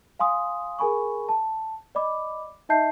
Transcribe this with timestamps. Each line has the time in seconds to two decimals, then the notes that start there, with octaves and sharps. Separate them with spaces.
0.19 F5 G#5 C6 D#6
0.79 G#4 A#4 G#5 B5 C#6
1.29 A5
1.95 D5 D#5 B5 D6
2.69 D#4 D#5 E5 A5 G6 C7